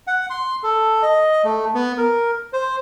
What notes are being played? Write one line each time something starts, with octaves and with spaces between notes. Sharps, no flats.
F#5
C6
A4
D#5
A3
B3
A#4
C5